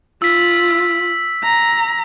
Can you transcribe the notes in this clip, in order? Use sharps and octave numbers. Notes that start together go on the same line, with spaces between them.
F4 E6 B6
A#5